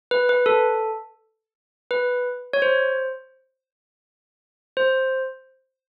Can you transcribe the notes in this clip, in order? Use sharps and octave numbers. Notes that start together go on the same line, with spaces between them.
B4
B4
A4
B4
C#5
C5
C5